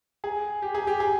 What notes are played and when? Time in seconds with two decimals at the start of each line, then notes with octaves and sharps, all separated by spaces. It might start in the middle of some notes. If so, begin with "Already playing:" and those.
0.24 G#4
0.62 G4
0.75 G#4
0.87 G4
1.00 G#4